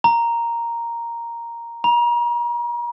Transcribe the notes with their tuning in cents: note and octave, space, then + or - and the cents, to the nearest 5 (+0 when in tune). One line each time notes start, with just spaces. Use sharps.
A#5 +0
A#5 +40